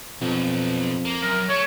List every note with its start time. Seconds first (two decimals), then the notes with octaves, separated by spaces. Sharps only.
0.21 B1 F2
1.05 A#3
1.22 F#2 A#4
1.49 A3 C#5